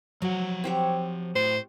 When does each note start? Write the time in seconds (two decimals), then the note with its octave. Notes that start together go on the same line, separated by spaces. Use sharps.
0.22 F3 F#3 F#5
0.64 C4 G4 C#5
1.35 A2 C5